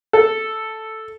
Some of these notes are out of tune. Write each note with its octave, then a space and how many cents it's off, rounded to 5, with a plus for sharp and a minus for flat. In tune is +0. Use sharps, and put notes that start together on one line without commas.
A4 +0